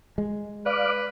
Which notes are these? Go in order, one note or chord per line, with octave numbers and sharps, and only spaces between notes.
G#3
B4 D5 F5 D6